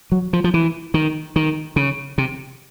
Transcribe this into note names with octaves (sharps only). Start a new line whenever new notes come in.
F#3
F3
F3
E3
D#3
D#3
C#3
C3